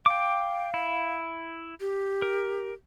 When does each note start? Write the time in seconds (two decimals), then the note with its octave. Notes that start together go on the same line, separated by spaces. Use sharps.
0.06 F5 G5 D6
0.74 E4
1.80 G4
2.22 A#4